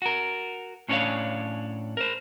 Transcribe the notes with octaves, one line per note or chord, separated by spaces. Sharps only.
F#4 A#4
A2 C#4 D4 A4 C#5 F5
A#4 C5